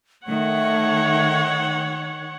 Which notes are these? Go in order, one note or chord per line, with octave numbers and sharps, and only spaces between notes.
D#3 A3 C#5 F#5